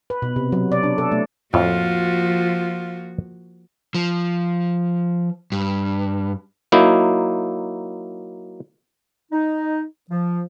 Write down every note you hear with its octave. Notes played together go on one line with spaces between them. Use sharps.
B4
B2
C3
F#3
D5
D4
A4
A3
F2 A2 F3 A#3 F4 F#4
F3
G2
F#3 A#3 D#4 E4
D#4
F3